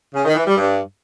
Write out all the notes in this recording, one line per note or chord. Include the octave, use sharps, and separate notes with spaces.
C#3
D#3
E3
G3
G2